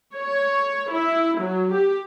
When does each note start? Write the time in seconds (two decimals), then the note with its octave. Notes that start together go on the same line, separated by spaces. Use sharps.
0.14 C#5
0.91 E4
1.40 F#3
1.74 G4